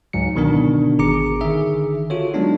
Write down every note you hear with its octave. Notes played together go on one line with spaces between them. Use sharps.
C#2 G#2 F#3 C#7
B2 D3 D#3 B3 D4 A#4
G#1 G#4 A#5 D6 C#7
D3 D#3 G#4 E5
F4 F#4 A4 C#5
F#3 G#3 B3 D4 D#4